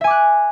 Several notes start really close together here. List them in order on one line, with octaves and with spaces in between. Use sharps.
E5 G#5 D6 F#6